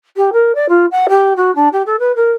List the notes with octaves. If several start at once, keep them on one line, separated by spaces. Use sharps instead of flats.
G4
A#4
D5
F4
F#5
G4
F#4
D4
G4
A4
B4
A#4